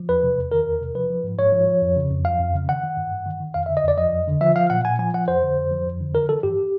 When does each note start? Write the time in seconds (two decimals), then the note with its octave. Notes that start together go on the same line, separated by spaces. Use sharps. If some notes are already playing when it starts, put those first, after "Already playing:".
Already playing: F3
0.09 E2 B4
0.23 C3
0.38 E2
0.52 D#3 A#4
0.67 E2
0.81 C3
0.95 F3 B4
1.10 F3
1.24 G#2
1.39 G#2 C#5
1.52 F3
1.67 F3
1.82 F2
1.96 C#3
2.11 F2
2.25 F3 F5
2.40 F2
2.54 C#3
2.68 D#3 F#5
2.83 D#3
2.97 G2
3.11 G2
3.26 D#3
3.40 D#3
3.54 F2 F5
3.66 E5
3.69 D3
3.77 D#5
3.84 F2 D5
3.98 F3 D#5
4.12 F2
4.28 D3
4.41 F3 E5
4.56 F3 F5
4.70 A#2 F#5
4.85 A#2 G#5
4.99 F3 G#5
5.14 F3 F#5
5.28 F2 C5
5.42 D3
5.58 F2
5.71 F3
5.86 F2
6.01 D3
6.14 E3 A#4
6.29 E3 A4
6.43 G2 G4